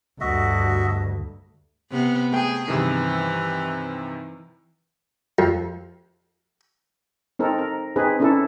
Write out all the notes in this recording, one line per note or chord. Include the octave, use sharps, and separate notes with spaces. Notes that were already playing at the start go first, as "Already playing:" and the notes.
D2 G2 F#4 D#5 E5
C3 B3
A3 G#4 G5
G2 C3 D#3 E3
F2
C4 D#4 A4 A#4
A#4
C4 D#4 G#4 B4
C#4 D4 E4 A4